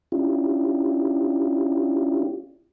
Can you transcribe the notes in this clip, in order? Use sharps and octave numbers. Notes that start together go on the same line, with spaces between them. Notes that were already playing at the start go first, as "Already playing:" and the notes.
C#4 D4 E4 F4 G4